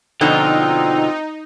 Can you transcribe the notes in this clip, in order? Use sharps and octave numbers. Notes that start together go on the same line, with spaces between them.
B2 D3 F3 C4 D#4 F4